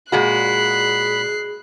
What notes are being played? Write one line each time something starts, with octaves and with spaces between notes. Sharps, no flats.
A#2 G#3 F#4 G#4 B5 F#6 C7